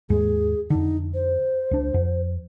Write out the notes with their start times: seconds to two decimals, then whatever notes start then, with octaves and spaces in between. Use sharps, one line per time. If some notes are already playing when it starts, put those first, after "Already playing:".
0.10 D#2 G#2 G#3 G#4
0.70 F2 D3 D#4
1.14 C5
1.71 C#2 D4
1.94 F2